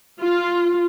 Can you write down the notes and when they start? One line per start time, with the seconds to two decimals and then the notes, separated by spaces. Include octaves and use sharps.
0.20 F4